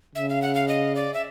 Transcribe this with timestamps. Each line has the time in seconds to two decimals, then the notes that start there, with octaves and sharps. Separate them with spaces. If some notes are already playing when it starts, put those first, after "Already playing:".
0.15 C#3 E5
0.29 F5
0.42 F#5
0.55 F5
0.68 D#5
0.95 D5
1.14 E5